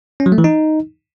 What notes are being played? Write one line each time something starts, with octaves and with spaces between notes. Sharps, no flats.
C#4
F#3
A3
E3
D#4